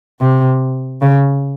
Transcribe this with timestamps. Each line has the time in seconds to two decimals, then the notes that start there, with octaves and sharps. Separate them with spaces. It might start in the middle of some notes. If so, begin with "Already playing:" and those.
0.20 C3
1.01 C#3